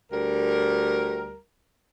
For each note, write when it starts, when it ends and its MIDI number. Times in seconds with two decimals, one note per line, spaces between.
0.12 1.38 38
0.12 1.38 55
0.12 1.38 70